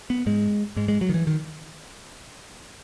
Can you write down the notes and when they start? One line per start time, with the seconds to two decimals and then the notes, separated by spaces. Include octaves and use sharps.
0.10 B3
0.26 G#2 G#3
0.76 G#2 G#3
0.88 G#3
1.01 F#3
1.09 D#3
1.14 E3
1.27 D#3